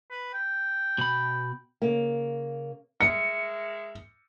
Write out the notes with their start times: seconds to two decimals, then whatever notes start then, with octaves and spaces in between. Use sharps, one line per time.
0.11 B4
0.34 G5
0.98 B2 B5
1.82 C#3 A#3
3.01 G#3 A#4 E5 C#7